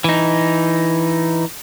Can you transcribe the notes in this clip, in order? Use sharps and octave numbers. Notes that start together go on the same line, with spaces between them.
E3 D#4